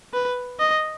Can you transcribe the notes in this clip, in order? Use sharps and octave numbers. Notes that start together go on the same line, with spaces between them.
B4
D#5